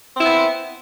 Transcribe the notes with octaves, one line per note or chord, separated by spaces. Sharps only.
B3 C4 E4